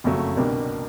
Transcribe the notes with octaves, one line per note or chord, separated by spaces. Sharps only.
F#1 F2 C#3 F#3 A3
C2 B2 G3 A#3 D4